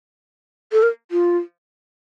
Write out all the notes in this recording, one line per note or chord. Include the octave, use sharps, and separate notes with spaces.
A4
A#4
F4